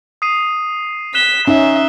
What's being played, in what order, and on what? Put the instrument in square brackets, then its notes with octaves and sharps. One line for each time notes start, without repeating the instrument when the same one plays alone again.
[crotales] D#6 C7 D#7
[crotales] F#6 E7 G7 [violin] B6
[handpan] C#4 D#4 [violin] E5